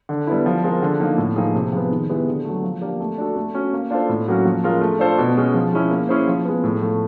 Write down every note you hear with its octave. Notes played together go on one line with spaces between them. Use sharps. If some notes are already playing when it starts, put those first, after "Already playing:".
D3
G3 B3 E4
F3
G#3 C4 F4 A#4
D3
F3 A#3 D#4
A2
F3 A#3 D#4 G#4
C3
F3 G#3 B3
D#3
G#3 B3 E4 G4
D3
F#3 A3
F3
A#3 D4 G4 A#4
A3
D4 F#4 A4
A3
C#4 F#4
A#3
D4 F4 A4 C5
A2
F#3 A#3 C#4 F#4
F3
G#3 C#4 F4 A#4
A3
D4 F4 A4 C5
B2
G#3 C#4
F3
G#3 C#4 E4
A#3
C#4 E4 G#4 C5
F3
G#3 B3
A2
F3 A3